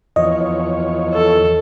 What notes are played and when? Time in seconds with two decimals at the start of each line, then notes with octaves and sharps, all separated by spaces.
0.16 E2 F3 C#5 D#5
1.13 A4